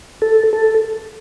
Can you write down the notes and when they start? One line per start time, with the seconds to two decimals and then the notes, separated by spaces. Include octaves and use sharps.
0.22 A4
0.53 A4